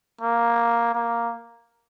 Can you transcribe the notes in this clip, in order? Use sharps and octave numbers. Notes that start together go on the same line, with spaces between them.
A#3
A#3